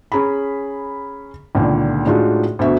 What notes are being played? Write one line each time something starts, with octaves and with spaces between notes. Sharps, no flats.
C#4 G#4 A#5 B5
C#2 A#2 D3 D#3
A2 G#3 D4 D#4 F4 F#4
D2 B2 E5